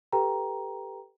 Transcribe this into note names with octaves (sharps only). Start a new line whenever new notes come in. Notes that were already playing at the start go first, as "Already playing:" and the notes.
G4 A4 B4 G5 A#5